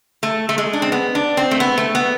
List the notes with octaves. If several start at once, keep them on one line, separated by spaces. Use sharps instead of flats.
A3
A3
G#3
D4
C4
B3
D4
C4
A3
B3
A3
B3